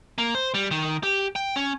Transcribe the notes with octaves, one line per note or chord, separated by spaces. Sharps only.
A#3
C5
G3
D#3
G4
G5
C#4